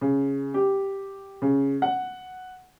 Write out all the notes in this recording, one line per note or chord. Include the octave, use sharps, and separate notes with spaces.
C#3
G4
C#3
F#5